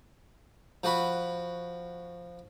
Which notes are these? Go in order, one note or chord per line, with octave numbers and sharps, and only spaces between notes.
F3 F#4 B5